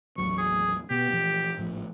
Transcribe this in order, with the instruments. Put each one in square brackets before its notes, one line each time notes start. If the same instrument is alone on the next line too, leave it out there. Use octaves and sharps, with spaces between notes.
[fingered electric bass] A1 D#2 F#3 [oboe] C#6
[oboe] G#4
[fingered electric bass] B2 B3 [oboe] G4
[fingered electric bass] A#2 E3 F3
G#1 A2 F3